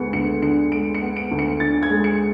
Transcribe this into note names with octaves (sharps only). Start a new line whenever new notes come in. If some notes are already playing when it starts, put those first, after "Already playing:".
Already playing: D2 G#3 B3 C#7
D2 C#7
D3 C#7
G#3 D7
C#7
B3
D7
D2
C#7
D3 A6
G#6
G#3
C#7